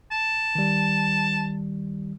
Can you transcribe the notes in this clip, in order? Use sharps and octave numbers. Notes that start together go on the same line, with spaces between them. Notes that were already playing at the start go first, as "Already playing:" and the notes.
A5
D#3 G3